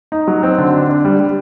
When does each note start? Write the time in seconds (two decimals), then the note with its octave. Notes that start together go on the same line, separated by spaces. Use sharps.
0.12 D#4
0.27 F#3
0.43 C4
0.58 D3
0.74 D4
0.90 D4
1.05 G3
1.20 G3